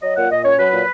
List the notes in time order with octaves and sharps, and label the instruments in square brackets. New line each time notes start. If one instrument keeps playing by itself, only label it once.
[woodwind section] F#3 D#5
A#2 F#5
A#2 D#5
C#4 C#5
F#3 B4
A#2